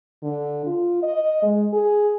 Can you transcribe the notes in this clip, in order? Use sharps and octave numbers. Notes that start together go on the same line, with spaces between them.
D3
F4
D#5
G#3
G#4